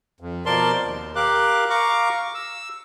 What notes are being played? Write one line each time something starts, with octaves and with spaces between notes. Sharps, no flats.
F2
B2 F3 A#4 D5 A5 C6
D#2
G4 A#4 F5 D6 F#6
F5 A#5 C#6 D6
E6